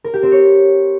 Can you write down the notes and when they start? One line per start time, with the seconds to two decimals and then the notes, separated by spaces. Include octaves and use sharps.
0.04 A#4
0.14 G4
0.23 C4
0.32 C#5